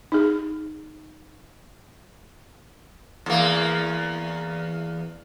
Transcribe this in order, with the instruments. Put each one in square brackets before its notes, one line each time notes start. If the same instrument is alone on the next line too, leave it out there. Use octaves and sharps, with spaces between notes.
[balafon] D#4 G#4
[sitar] E2 A#3